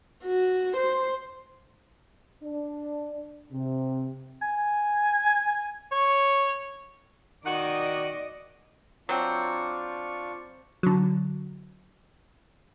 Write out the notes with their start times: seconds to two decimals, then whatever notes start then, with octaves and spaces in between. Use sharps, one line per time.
0.24 F#4
0.77 C5
2.43 D4
3.52 C3
4.42 G#5
5.92 C#5
7.45 D#3 F#4 D5 D#5 F#5
9.09 F#3 C4 D4 F4 C#6
10.83 D3 F#3